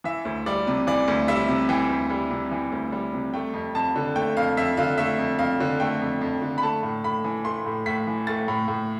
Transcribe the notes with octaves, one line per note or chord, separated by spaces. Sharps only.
E3 E5
D2
G3 D5
C3
E3 D5
D2
G3 E5
C3
E3 G5
D2
G3
C3
E3
D2
G3
C3
A3 G5
F2
F2 A5
D3
A3 G5
F2 F5
F2 E5
D3 F5
A3 E5
F2
F2 F5
D3
A3 G5
F2
F2
D3
B5
A3 A5
A2
A2 B5
E3
A3 C6
A2
A2 B6
E3
A3 A6
A2
A2